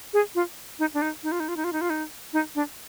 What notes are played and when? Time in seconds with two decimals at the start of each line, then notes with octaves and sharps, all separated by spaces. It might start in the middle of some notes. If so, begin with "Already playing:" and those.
0.13 G#4
0.35 F4
0.79 D#4
0.94 D4
1.02 D#4
1.23 D#4
1.32 F4
1.40 D#4
1.48 F4
1.57 D#4
1.64 F4
1.73 D#4
1.81 F4
1.90 D#4
2.33 D#4
2.55 D4